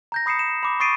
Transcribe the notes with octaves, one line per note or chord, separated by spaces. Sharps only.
A#5 G6 A#6
B5 D#6 C7 C#7 E7
E7
B5 D6
C#6 D#6 A6 C7 D7 D#7